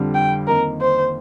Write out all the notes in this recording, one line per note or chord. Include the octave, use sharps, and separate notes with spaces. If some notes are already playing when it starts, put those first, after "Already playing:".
Already playing: F2 D3 G3 D4
G5
F2 D#3 A#3 D#4 A#4
C5